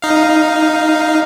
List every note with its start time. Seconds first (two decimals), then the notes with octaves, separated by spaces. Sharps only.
0.02 D#4 F5